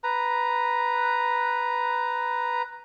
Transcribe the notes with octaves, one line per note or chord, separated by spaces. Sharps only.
B4 A#5